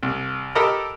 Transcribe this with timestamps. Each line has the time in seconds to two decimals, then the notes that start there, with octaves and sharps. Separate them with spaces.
0.03 C2
0.55 G4 A4 A#4 D#5 A#5 B5